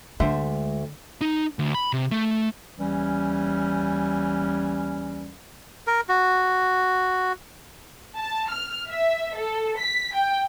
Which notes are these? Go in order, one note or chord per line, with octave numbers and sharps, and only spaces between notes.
D2 D3 G#3 C5 E5
D#4
D2
B5
C3
A3
D#2 E3 G3 C#4
A#4
F#4
A5
F6
E5
A4
B6
G5